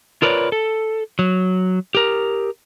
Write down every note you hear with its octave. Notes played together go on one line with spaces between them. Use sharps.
F4 A#4 B4 C#5 D5
A4
F#3
G4 A#4